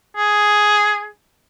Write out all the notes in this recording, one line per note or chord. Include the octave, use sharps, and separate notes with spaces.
G#4